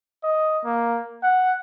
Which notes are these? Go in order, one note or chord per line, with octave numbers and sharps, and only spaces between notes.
D#5
A#3
F#5